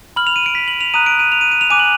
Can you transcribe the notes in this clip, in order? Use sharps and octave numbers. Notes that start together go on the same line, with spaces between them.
B5 F6 F#7
F7
D#7
D7
B6
F#7
F7
A#5 D#6 F#6 D#7
D7
D#7
F7
D#7
D#7
F7
G#5 D6 F#6 D#7
F#7